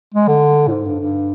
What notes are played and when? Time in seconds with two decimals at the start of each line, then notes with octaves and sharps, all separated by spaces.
0.14 G#3
0.28 D3
0.67 A2
0.71 G#2
0.85 G2
1.00 G2